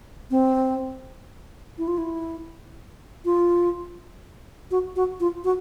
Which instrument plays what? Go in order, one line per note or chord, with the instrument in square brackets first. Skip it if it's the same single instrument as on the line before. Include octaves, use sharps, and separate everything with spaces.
[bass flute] C4
E4
F4
E4
F4
F#4
F#4
F4
F#4